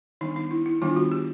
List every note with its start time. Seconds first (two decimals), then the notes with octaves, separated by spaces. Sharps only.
0.21 D#3 G3 B3 D4 D#4
0.36 D#4
0.51 E4
0.66 E4
0.82 D#3 G3 B3 D4 F4
0.96 F#4
1.12 G4